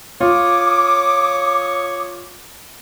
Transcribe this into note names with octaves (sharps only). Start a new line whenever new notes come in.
F4 C#5 D6 D#6